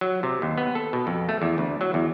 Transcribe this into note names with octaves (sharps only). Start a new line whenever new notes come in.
F#3
C3
D#2
B3
A4
B2
F2
A3
E2
D2
F#3
E2